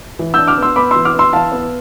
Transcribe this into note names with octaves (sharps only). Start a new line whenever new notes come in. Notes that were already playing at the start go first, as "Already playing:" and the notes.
E3
D4 E6 G6
D6 F6
B3
C6 E6
B3 B5 D6
E3 C6 E6
D6 F6
B3
C6 E6
E3 F5 A5
B3